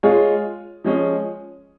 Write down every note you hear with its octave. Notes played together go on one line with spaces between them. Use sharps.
G#3 F4 G#4 C#5
F3 G#3 C#4 G#4